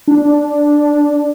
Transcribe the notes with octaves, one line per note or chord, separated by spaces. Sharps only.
D4